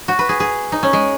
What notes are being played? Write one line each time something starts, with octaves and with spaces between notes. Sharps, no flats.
F#4
B4
G#4
G#4
D#4
C#4
G#3